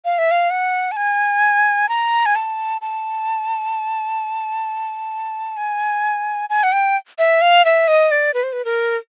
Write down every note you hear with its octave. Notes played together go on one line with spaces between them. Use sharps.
F5
E5
F5
F#5
A5
G#5
A#5
G#5
A5
A5
G#5
G#5
F#5
G5
E5
F5
E5
D#5
D5
B4
C5
B4
A#4